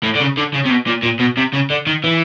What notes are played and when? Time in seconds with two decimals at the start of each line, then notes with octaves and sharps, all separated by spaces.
0.04 A2
0.15 D3
0.20 C#3
0.37 D3
0.53 C#3
0.65 C3
0.70 B2
0.87 A#2
1.03 A#2
1.20 B2
1.37 C3
1.53 C#3
1.70 D3
1.87 D#3
2.04 E3